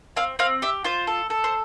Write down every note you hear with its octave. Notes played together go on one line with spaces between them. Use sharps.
C4 F5
C4 F5
G4 E5
F4 C5
A4
A4
C5